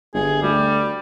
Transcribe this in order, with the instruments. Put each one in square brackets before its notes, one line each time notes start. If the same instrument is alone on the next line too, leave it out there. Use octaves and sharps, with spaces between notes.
[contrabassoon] G1 [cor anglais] G#4
[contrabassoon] D2 [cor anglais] G3